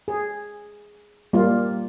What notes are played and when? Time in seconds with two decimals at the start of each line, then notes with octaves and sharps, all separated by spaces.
0.08 G#4
1.33 G3 A#3 F4